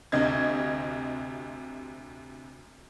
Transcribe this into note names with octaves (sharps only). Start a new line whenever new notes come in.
D2 C3 D#5 G#6